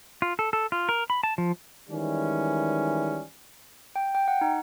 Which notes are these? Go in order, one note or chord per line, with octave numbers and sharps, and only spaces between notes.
F4
A4
A4
F4
A#4
B5
A5
F3
D#3 E3 G3 G#3 C#4
G5
G5
F#5
D#4